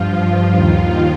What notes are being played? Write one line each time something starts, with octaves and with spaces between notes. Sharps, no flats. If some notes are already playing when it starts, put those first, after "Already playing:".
Already playing: G2 F3 F4
D#2 D#3